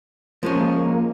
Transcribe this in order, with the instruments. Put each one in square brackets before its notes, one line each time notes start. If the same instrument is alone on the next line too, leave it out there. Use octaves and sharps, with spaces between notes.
[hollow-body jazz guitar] F3 G#3 C#4 [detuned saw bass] A#3